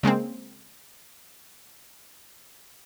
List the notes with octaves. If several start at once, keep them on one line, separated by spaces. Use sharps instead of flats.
C#3 G#3 A#3 C4